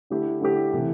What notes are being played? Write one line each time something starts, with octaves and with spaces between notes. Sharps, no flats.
D3 A3 E4 G4
D3 A3 E4 G4
C3 E3 A3 E4